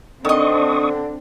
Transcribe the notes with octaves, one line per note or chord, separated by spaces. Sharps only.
D3 D#3 C4 D4 D#5 C#6 D#6